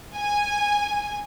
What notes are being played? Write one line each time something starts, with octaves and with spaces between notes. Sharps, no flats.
G#5